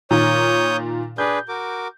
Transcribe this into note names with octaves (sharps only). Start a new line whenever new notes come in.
A#2 D#3 C#5 A#5 D#6 G6
D4 G#4 B4 G6
F#4 A#4 D6